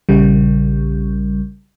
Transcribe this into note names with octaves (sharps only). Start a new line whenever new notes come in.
A#1 C#3 G3